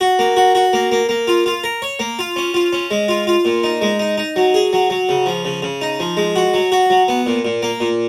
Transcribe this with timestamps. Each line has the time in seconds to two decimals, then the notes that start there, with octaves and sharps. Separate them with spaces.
0.01 F#4
0.19 A#3
0.36 F#4
0.55 F#4
0.73 A#3
0.91 A#3
1.09 A#3
1.27 F4
1.46 F4
1.64 A#4
1.82 C#5
1.99 A#3
2.19 F4
2.36 C#4
2.54 F4
2.73 C#4
2.91 G#3
3.08 F4
3.27 F4
3.45 A#2
3.64 D#4
3.82 G#3
3.99 D#4
4.17 D#4
4.36 F#3
4.54 G#4
4.73 F#3
4.90 F#3
5.09 C#3
5.26 F3
5.45 C#3
5.62 C#3
5.81 D#4
6.00 F3
6.17 G#3
6.36 F#4
6.54 F#3
6.72 F#4
6.90 F#3
7.08 B3
7.26 A#2
7.45 A#2
7.63 A#3
7.80 A#2